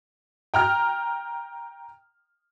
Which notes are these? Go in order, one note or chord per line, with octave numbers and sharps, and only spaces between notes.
G5 A#5 F6